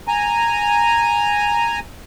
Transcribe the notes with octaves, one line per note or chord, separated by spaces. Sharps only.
G#5 A#5